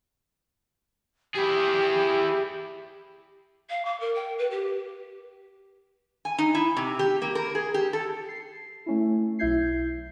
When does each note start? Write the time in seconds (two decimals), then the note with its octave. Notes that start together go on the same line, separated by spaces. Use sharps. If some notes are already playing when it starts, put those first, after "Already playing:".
1.35 E4 G4 G#4
3.70 F5
3.85 D6
4.00 A#4
4.15 G5
4.38 B4
4.51 G4
6.25 G#5
6.38 D#4
6.55 E4
6.77 C3
6.99 G4
7.22 A#3
7.35 A#4
7.55 G#4
7.74 G4
7.93 A4
8.28 C7
8.86 A3 C#4 E4
9.39 B1 E4 E5 G6 G#6 C7